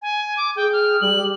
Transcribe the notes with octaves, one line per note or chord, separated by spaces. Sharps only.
G#5
D6
G#4 G5
F6
G3 F#7
G4